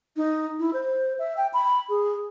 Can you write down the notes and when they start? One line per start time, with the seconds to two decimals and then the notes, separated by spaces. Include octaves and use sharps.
0.17 D#4
0.59 E4
0.73 C5
1.19 E5
1.37 G5
1.54 B5
1.89 G#4